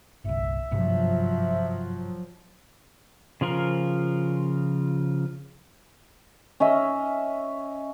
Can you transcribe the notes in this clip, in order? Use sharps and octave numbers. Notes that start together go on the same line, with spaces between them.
G1 C2 E5
G#1 G2 C3 F3 F#3
C#3 F3 F4 A#4
C#4 D#5 E5